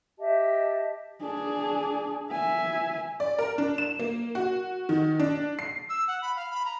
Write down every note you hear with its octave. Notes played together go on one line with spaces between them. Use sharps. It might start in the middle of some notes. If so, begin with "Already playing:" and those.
G4 D#5 E5 A5
D4 G#4
E5 G#5
D5
A#4
D4
E7
A#3
F#4
D#3
D4
C7
E6
F#5
B5
F5
B5
A#5